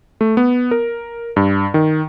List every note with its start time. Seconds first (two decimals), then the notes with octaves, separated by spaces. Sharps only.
0.21 A3
0.37 B3
0.71 A#4
1.36 G2
1.74 D#3